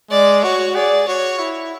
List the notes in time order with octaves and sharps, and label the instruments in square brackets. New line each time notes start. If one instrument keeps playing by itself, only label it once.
[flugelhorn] G#3 [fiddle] D5
[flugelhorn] F#4 [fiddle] C#5
[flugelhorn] G#4 [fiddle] D5
[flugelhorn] F#4 [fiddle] C#5
[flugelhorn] E4